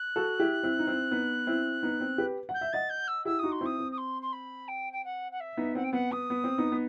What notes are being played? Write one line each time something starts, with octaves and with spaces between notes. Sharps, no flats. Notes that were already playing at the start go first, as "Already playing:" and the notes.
Already playing: F#6
F#4 A4
E4 G4
C4 E4
D#4
C4 E4
B3 D#4
C4 E4
B3 D#4
C4
G4 B4
F#5 G6
E5
D#5 F#5 A6
G6
E6
E4 G4 E6
D#4 F#4 D#6
C6
C4 E4 D#6
C4
D#6
C6
C6
B5
G5
G5
F#5
F#5
E5
B3 D#4
C4 F#5
G5
B3 F#5
B3 D#6
B3
C4
B3 D#4
B3